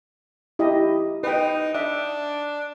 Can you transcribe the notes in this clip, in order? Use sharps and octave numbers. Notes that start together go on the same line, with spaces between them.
E4 G4 D#5
D#4 B4 G5
D4 E5